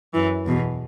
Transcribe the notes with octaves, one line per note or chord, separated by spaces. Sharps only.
F#2 E3
E2 B2